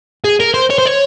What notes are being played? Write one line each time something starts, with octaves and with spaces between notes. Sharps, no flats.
G#4
A#4
C5
C#5
C5
C#5